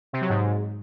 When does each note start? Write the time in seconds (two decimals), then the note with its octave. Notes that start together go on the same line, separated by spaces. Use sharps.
0.13 C3
0.21 F#3
0.29 G#2